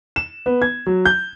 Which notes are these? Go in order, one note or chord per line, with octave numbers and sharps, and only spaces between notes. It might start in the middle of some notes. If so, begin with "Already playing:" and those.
E7
B3
G#6
F#3
G6